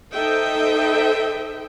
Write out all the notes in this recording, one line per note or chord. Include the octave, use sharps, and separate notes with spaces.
D#4 A4 C5 D#5 E5 G5